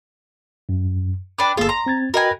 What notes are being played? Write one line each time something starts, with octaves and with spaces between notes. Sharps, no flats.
F#2
D4 B4 G5 B5 D6
G1 A#3 F4 G#4 A4
A#5 C6
C4 G#6 A6
F#4 A#4 B4 D#5 G5 G#5